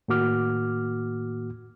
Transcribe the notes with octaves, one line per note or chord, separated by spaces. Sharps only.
A2 D#3 A#3 F#4 D6 F6